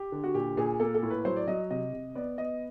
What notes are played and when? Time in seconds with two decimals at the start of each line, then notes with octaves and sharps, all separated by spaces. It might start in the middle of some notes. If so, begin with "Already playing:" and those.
Already playing: G4
0.12 D3
0.24 F#4
0.34 A#2 G4
0.57 A#2 G#4
0.80 A#3 A4
0.94 A4
1.03 A2
1.10 B4
1.25 F#3 C5
1.36 D5
1.47 F#3 D#5
1.71 C3 D#5
1.93 C3
2.15 B3 D5
2.38 B3 D#5